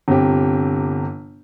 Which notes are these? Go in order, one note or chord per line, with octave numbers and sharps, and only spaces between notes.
G1 C3 G4